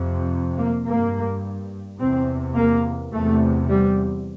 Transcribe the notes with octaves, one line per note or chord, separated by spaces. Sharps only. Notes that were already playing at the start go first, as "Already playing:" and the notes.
Already playing: F2 C3
A#3
G2 A#3
E2 C3 C4
A#3
E2 C3 A3
G3